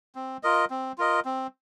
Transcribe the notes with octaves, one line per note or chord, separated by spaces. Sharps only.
C4
F4 A#4 D#5
C4
F4 A#4 D#5
C4